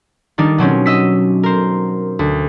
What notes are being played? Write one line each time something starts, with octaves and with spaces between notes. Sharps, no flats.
D#3 G3 D4 D#4
B2 F#3 C4 C#4
D#5 E6 B6
A#4 C5
D2